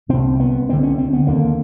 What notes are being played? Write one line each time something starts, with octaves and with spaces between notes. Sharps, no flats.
C2 C3 C4
B3
D2 D3 C4
C#4
C4
B3
D#2 D3 A#3